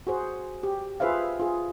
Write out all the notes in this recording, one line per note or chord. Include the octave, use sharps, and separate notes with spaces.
F#4 G#4 C5
G4
F4 G#4 B4 C5 E5 F5
F4 G#4